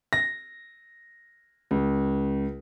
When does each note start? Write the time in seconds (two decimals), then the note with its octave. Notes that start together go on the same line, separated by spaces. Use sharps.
0.13 A#6
1.71 C#2